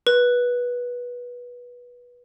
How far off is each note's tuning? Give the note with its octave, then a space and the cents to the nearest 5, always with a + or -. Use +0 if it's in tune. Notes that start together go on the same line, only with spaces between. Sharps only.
B4 -20